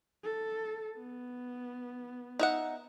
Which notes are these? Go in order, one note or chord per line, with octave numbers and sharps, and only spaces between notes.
A4
B3
D#4 E5 F#5